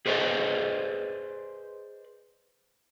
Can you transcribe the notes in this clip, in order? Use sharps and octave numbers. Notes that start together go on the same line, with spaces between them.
G#4 B4 C5 D5 D#5